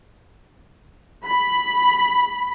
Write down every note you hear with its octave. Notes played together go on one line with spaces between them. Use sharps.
B5